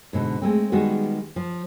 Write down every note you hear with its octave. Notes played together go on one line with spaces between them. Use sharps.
G#2 B2 D3
G#3 A3 C4
D#3 G3 G#3 B3 F#4
F3